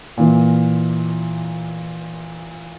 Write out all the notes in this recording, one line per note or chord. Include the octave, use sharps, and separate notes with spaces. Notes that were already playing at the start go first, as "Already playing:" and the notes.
A#2 E3